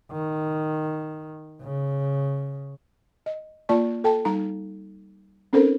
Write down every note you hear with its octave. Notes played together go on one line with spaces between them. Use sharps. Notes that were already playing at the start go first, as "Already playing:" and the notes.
D#3
C#3
D#5
A#3 F4 D5 A5 C#6
A4 G5 A5
G3 D#4 A#5
C4 C#4 D#4 A4 A#4 C5